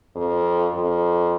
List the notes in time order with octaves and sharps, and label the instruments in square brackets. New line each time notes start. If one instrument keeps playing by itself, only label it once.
[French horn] F2
F2